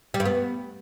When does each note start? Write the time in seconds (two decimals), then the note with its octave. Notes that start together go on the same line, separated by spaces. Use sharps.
0.14 G3
0.20 G2
0.25 B3